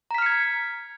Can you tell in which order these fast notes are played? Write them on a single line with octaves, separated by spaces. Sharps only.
A#5 B6 F6 C#7 G#6